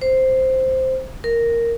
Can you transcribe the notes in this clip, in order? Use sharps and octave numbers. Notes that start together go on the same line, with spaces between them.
C5
A#4